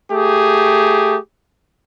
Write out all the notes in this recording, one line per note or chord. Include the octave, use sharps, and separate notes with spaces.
A3 G4 G#4